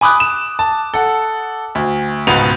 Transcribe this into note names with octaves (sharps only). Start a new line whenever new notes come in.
G#5 B5 D6 D#6 F#6
E7
A5
A4 F#5
D2
C#2 G#2 B2 B3 F7